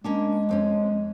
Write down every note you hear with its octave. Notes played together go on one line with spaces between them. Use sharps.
G#3 A#3 C#4 D4
F2 C4 C#4